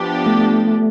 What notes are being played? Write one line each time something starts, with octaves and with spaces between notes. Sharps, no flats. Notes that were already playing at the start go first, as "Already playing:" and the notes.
Already playing: F3 B3 D4 G4
A3